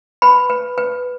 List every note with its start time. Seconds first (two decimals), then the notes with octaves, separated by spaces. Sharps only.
0.22 B4 B5
0.50 B4
0.78 B4